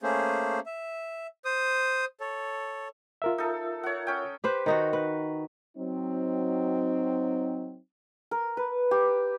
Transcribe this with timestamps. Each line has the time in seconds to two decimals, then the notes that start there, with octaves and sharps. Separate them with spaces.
0.03 A3 A#3 C#4 G#4 C5
0.66 E5
1.45 C5 D#6
2.20 A4 C#5
3.22 F4 A#4 E5
3.38 D#4 A4
3.83 C#5 F#5
4.07 C#4 G5
4.44 G4 B4 C5
4.66 D#3 D#4 F#4
4.93 B4
5.77 F#3 C4 D#4
8.31 A#4
8.57 B4
8.91 G4